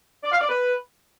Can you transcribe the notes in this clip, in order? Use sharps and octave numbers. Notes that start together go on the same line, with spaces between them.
D5
F5
D5
B4